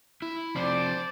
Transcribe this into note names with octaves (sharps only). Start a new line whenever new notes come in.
E4
C3 F3 C5 D5